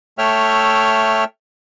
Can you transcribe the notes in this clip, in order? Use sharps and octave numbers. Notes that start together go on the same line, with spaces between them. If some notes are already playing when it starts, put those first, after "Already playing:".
A3 C#5 E5 G5 F6